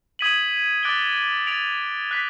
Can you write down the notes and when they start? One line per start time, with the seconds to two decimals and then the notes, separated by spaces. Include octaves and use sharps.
0.19 D#6 G#6 B6 D#7 F#7
0.83 D6 F#6 A6 D7 G7
1.47 A6 D7 F7
2.11 F#6 B6